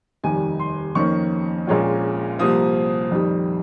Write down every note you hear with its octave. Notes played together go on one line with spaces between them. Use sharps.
F1 D#2 D#3 G3 G#5
C6
F2 D#3 A#3 C#4 C#6
A#1 A#2 G#3 C#4 F4
C2 C3 F3 A#3 D#6
F2 D#3 G3